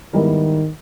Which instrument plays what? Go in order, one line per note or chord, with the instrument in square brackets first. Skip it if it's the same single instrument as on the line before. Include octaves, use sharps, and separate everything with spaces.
[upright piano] G#2 G3 B3 E4 A#4 [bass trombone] D#3